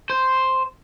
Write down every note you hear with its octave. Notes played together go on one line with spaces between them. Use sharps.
C5